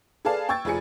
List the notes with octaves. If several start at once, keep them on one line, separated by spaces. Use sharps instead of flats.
G#4 A4 B4 D5 F5 A5
G5 C#6 E6 G#6 A6
F1 F3 G#4 G#5 C#7